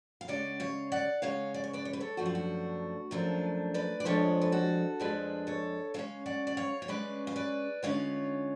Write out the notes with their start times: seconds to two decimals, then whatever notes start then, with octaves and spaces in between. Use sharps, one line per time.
0.21 F5
0.28 C#3 G#3 C#4 D5 F#5
0.60 C#5 F5
0.92 D5 F#5
1.22 C#3 G#3 C#4 C#5 F5
1.54 D5
1.64 C#5
1.73 B4 D5
1.85 C#5
1.93 B4
2.00 A4 C#5
2.17 F#2 F3 A3 D4 F#4
2.26 F4
2.35 F#4
3.11 F#2 F3 A3 D4 F4
3.74 B4 D5
4.00 D5
4.05 F2 F3 G#3 D4 F4 A4 C#5
4.41 B4
4.52 F#4 A4
5.00 F2 F3 G#3 D4 G#4 B4
5.47 A4 C#5
5.94 C#3 G#3 C#4 C#5 F5
6.26 D5 F#5
6.47 D5
6.57 C#5 F5
6.82 C#5
6.88 C#3 G#3 C#4 B4 D5
7.27 F5
7.36 B4 D5
7.83 D3 G#3 C#4 F4 C#5 F5